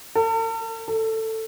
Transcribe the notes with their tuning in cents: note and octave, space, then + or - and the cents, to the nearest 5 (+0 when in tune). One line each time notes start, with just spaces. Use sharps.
A4 +45
A4 +15